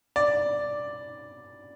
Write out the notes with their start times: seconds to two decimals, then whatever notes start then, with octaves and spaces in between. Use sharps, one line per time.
0.16 D5